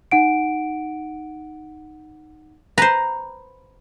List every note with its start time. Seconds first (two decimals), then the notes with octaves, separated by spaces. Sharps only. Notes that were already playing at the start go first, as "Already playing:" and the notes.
0.11 D#4 F#5 D7
2.78 B4 C5 A#5